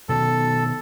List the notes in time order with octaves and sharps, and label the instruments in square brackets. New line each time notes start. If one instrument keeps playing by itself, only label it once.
[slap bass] B2 D#3 F#3 [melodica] A4